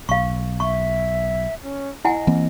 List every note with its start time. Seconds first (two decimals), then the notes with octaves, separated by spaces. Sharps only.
0.09 B1 F5 C#6
0.60 E5 C#6
1.62 C#4
2.05 E4 D#5 F#5 G#5
2.27 E3 A#3 C4